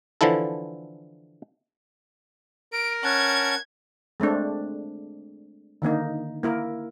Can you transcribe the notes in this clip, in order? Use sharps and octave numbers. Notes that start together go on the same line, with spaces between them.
D3 E3 F3 E4 A4
A#4 D7
C#4 F#5 A5 G#6
G#3 A3 C4 D4
D3 D#3 A#3 D#4
A#3 E4 A#4